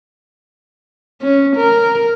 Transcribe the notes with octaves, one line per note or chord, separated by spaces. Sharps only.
C#4
A#4